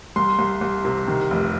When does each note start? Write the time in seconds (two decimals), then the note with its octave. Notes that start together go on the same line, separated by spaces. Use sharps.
0.16 C2 C6
0.39 C2
0.61 C2
0.85 C3
1.07 D#3
1.31 F1